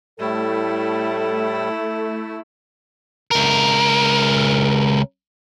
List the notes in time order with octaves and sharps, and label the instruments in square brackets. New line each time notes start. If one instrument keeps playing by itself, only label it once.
[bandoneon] A2 G3 [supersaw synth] A3 [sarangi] E4 [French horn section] A4
[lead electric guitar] C#2 A#4